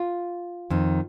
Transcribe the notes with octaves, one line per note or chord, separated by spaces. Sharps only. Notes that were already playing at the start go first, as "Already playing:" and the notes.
Already playing: F4
F2 D#3